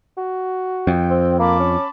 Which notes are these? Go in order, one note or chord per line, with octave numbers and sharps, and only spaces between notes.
F#4
F2 G5
C4
A#3 A5 B5 D6
C#4